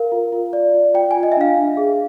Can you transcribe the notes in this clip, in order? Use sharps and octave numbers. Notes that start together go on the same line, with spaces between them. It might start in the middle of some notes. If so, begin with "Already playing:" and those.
Already playing: A#4 F5
F4
F4
D5
F4
F4 G5
F4 G#5
D#5
E5
D4 F5
D4
G#4